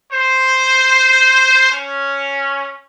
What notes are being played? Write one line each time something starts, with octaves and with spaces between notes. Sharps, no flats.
C5
C#4